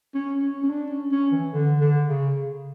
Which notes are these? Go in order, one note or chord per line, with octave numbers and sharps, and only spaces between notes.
C#4
C#4
C#4
D4
C#4
C#4
E3
D3
D3
C#3